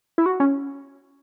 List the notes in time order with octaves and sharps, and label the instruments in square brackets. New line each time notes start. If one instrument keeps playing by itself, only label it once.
[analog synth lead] E4
F#4
C#4